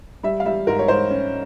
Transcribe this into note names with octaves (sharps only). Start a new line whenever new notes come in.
G3 E5
F5
G3 E5
G#2 A#4
C#5
G#2 C5
C#4